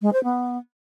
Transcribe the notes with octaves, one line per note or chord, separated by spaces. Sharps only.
G#3
C5
B3